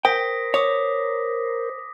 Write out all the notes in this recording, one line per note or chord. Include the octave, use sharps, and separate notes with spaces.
A#4 C5 G5 D#6 A#6 B6
C#5 D6 D#6